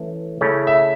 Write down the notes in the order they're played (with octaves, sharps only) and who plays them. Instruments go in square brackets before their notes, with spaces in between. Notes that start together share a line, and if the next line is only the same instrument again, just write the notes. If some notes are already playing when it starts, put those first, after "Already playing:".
Already playing: [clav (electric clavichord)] E3 A3 C#4
C#3 A3 C#4 E4
[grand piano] E5